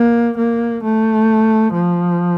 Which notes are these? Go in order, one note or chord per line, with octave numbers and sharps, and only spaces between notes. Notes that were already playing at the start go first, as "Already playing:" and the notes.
Already playing: A#3
A#3
A3
F3